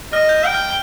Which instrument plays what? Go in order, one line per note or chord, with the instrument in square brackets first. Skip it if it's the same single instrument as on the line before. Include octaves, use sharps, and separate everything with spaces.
[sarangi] D#5 [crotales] F6
[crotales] G6
[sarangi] G5 [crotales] F6
[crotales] F6